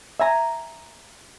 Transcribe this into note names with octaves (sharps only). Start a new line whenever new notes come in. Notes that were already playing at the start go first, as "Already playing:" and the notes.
E5 G#5 A#5